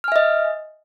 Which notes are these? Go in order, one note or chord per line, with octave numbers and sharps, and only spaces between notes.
D#5 E5 G#5 F6